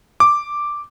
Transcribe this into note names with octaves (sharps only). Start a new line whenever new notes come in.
D6